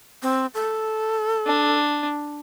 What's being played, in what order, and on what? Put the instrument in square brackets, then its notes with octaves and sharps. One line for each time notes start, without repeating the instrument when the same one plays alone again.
[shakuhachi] C4
A4
[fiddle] D4